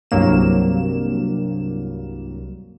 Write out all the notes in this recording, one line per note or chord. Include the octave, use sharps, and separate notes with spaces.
C2 G2 F#3 A#3 E7